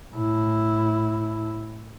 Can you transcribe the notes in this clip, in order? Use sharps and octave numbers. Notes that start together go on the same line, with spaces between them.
A2 E4